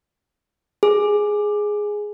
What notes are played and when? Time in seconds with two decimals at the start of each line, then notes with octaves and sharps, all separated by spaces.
0.83 G#4